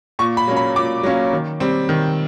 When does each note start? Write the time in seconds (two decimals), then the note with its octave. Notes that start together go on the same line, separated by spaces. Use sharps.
0.19 A#2 C#6
0.37 B5
0.48 F#3 A#3 C#4
0.56 B5
0.76 A#2 D6
1.03 F#3 A#3 C#4
1.33 D#3
1.60 G3 C4
1.89 D#3